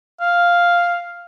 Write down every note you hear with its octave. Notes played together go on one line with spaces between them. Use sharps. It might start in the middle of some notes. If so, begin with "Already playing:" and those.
F5